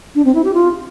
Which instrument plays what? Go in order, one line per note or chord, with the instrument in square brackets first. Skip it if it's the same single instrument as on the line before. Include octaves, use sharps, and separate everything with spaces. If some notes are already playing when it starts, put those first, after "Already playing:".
[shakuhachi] D4
C4
E4
G4
F4